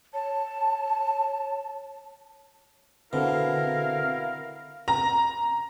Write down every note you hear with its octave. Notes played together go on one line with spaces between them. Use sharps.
C#5 A5
B2 D3 C4 E4 A4 A#4 F5 F6
A#5